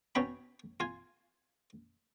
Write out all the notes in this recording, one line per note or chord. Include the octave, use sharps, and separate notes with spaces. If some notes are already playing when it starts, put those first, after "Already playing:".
B2 C#4 D#4 G5 B5
F4 G#5